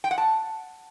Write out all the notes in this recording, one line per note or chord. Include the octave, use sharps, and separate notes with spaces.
G5
F#5
A5